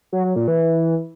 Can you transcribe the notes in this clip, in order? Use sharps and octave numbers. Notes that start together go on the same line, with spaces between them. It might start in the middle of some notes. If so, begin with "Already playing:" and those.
F#3
F#3
A#2
E3